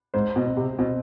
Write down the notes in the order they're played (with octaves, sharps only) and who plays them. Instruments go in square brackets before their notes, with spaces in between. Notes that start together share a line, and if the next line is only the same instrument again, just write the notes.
[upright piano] G#2 [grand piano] C5
[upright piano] B2
[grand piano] C4
[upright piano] C3
[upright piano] B2 [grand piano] C4